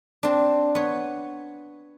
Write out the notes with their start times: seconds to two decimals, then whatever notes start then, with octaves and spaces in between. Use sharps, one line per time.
0.23 C4 D4
0.75 B3 C#5